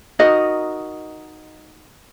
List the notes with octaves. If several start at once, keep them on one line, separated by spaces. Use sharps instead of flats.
D#4 F#4 A#4 D#5